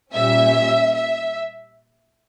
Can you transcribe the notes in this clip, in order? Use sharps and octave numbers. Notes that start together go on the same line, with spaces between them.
A#2 G3 C#4 E5
E5